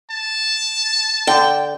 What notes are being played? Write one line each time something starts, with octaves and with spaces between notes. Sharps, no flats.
A5
D3 G5